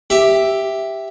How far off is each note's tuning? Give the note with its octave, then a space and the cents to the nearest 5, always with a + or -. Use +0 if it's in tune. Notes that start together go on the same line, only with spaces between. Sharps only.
G4 +0 E5 +0